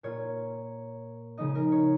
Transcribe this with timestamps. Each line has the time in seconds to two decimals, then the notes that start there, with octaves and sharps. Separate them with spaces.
0.03 A#2 A#3 F4 C#5
1.38 C#3 F3 G#3 D#4 D#5
1.55 A#4
1.72 C#5